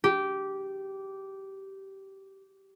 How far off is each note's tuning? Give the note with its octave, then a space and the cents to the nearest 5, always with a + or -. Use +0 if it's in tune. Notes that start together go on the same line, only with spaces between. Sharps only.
G4 -15